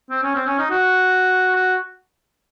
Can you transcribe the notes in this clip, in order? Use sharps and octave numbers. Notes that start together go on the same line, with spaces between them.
C4
C#4
C4
C#4
D#4
F#4
F#4